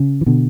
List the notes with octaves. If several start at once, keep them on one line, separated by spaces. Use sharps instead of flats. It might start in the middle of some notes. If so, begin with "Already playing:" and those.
Already playing: C#3
E3
B2 D3